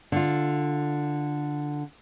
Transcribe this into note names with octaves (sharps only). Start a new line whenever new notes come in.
D3 F4